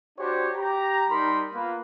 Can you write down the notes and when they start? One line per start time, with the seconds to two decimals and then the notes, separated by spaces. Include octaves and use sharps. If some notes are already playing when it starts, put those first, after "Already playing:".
0.19 D4 F#4 G4 C5 C#5
0.56 G4 A#5
1.10 G3 D#4 A#4 B5 C6
1.53 A#3 B3 F4 A#4 B4